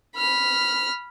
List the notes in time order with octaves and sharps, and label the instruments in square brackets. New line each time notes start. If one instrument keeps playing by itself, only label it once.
[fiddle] B5 F6